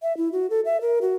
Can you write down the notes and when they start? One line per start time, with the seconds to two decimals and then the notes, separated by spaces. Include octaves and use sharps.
0.02 E5
0.17 E4
0.32 F#4
0.50 A4
0.65 E5
0.81 A#4
1.02 F#4